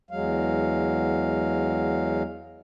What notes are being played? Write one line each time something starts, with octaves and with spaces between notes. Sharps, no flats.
E2 F#3 G#3 F5